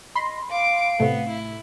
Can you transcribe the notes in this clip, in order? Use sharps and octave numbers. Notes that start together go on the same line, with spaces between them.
D#5 B5 C6
F5 D6 D7
A2 C3 A3 B3
E4